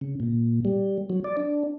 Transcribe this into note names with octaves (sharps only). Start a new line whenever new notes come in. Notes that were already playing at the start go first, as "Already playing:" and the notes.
C#3
A#2
G3
F#3
D5
D4